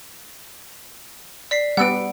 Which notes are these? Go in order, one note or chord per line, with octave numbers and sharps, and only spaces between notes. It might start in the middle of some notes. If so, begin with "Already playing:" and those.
D5 B6 C7
G3 B3 F#5 E6 D7